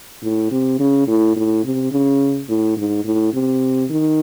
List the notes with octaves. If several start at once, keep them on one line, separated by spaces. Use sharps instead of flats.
A2
C3
C#3
A2
A2
C3
C#3
A2
G#2
A2
C3
D#3